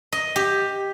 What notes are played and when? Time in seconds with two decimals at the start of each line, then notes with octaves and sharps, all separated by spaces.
0.12 D#5
0.36 G4